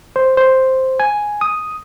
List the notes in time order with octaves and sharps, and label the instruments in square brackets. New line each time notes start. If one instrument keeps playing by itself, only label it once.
[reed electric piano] C5
C5
G#5
D#6